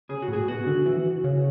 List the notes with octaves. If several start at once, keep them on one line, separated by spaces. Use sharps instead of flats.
C#3 G#4
F#4
A2
G#4
B2 F#4
D3
E3
C#3